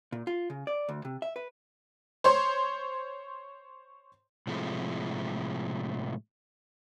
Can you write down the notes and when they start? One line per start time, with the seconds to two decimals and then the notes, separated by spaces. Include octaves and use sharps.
0.12 A#2
0.27 F4
0.50 C#3
0.67 D5
0.89 D2
1.05 C3
1.22 E5
1.36 B4
2.24 C5 C#5 C6
4.47 A2 C3 F3 G#3 A3